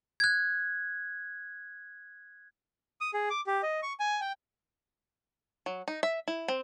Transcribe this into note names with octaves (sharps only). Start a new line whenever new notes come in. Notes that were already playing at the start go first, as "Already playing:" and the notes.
F#6 G#6
D#6
G#4
D6
G4
D#5
C#6
G#5
G5
F#3
D#4
E5
E4
C4